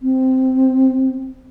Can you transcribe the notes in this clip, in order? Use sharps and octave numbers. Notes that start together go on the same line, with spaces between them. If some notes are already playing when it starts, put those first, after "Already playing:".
C4